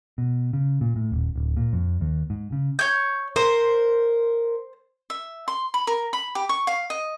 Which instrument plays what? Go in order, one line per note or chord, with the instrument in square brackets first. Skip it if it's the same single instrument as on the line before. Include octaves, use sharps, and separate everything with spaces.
[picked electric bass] B2
C#3
A#2
A2
D#1
D1
A#2
F2
D#2
G#2
C#3
[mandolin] C#5 G6
[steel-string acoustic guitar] A#4 [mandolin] C5
[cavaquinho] E5
C6
B5
A#4
B5
G4
C#6
F5
D#5